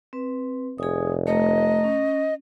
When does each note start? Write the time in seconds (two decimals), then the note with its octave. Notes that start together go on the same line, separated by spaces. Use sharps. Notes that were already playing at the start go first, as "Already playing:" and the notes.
0.13 C4 B4
0.78 F1 G#4 G#5 D#6
1.27 A3 D#5 A#5
1.84 C#4